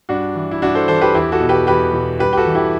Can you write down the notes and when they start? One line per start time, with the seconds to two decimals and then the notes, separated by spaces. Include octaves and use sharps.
0.09 G2 D4 F#4
0.35 E3
0.51 E4
0.62 G2 D4 F#4
0.75 A4 C5
0.88 E3 A4 C5
1.01 G4 B4
1.14 E2 E4 G4
1.32 F#4 A4
1.41 B2
1.49 G4 B4
1.67 E2 G4 B4
1.94 B2
2.19 G2 G4 B4
2.33 G4
2.37 F#4 A4
2.46 E3
2.55 E4 G4